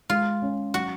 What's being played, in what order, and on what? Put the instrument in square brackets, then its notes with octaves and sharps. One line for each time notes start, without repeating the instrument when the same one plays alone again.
[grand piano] G#3 [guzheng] F4
[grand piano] C#4
[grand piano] F#3 [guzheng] F#4